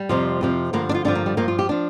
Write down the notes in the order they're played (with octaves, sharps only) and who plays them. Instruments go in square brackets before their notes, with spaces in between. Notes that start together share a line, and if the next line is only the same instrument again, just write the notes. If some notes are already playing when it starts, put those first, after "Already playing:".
Already playing: [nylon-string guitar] G3
F2 C3 F3
F2 C3 F3
G2 D3 F3 A#3
D4
F4
G2 D3 F3 D4
A#3
G3
G2 F3 A#3
F4
G4
F3 D4